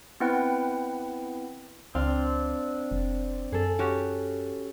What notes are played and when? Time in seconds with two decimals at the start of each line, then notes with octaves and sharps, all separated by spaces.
0.20 B3 C4 E4 B4 F#5 G5
1.95 C#2 C4 D4 F5
2.91 F1
3.52 F#2 G#4 A4
3.79 C#4 F#4 G4